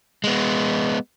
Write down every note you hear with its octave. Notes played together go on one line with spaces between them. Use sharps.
G#3 B3